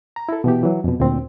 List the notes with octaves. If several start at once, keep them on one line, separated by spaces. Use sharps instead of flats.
A#5
E4 A4
B2 E3 G4
E3 F#3
F2 B2
D2 A#2 C4